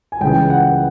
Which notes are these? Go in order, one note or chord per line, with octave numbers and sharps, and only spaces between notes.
G#5
C#2 C#3 E3 G#3 G5
F#5